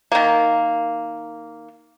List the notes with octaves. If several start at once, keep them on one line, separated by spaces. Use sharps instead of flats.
D#3 A#3